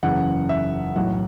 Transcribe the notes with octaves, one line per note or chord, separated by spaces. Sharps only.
F#1 E2 C#3 E3 F#5
E5
B1 A2 E3 F#5